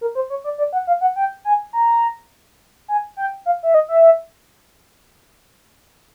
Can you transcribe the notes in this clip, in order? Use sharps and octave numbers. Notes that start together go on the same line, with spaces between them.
A#4
C5
C#5
D5
D5
F#5
F5
F#5
G5
G#5
A#5
G#5
G5
F5
E5
D#5
E5